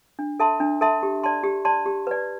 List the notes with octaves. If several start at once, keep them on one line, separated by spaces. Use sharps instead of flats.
D4
A4 E5 A5 C6
D4
A4 E5 A5 C6
G4
D5 A5 C6
G4
D5 A5 C6
G4
B4 D5